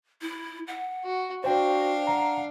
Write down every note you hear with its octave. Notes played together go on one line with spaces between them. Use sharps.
E4
F#5
F#4
D4 F#4 C5 F5 G5
F#5 A#5